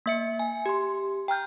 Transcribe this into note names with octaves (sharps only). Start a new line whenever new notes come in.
A#3 E5 C#7
G#5
G4 C6
G5 A#5 F6 G6